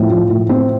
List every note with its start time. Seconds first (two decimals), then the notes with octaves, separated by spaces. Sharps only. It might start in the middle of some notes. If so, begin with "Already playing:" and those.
Already playing: A2 F3 C4
0.10 F3
0.30 A2
0.49 C4